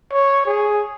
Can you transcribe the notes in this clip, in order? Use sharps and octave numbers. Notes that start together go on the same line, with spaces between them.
C#5
G#4